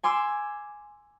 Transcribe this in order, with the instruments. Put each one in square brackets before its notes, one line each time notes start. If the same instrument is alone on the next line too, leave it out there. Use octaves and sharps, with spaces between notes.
[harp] G#5 C6 D6 E6